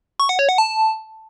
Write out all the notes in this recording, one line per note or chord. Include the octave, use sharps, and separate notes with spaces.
C#6
F#5
C#5
F#5
A5